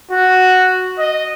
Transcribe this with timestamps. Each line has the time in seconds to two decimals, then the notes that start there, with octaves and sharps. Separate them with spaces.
0.11 F#4
0.98 D#5